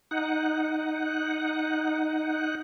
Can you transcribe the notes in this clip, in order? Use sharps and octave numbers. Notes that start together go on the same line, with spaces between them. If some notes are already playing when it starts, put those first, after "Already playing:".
D#4 F#5